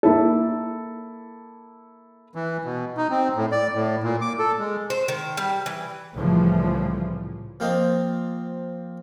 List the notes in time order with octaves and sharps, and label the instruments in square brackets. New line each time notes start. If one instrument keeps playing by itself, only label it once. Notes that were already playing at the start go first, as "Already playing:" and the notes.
[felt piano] A#3 E4 A4
[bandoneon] E3
B2
D#4
C4
A2
D5
A2
A#2
D6
A4
G#3
[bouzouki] C5
D#3
G3
E3
[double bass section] C2 A2 C#3 E3 F3 A3
[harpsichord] F3 A#3 C4 F4 C5 D#5